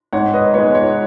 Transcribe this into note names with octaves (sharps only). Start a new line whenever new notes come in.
G#2 C#5 F#5
B4 D#5
G#3 B3 C#5
C#5